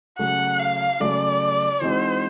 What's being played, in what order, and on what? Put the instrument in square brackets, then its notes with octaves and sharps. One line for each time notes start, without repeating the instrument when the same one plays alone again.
[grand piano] C#3 F#3 A3 [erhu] F#5
[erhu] F5
[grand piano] C#3 F#3 A3 [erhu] D5
[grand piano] E3 G#3 C4 D#4 F#4 [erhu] C5